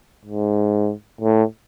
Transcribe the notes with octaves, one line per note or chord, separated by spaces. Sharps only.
G#2
A2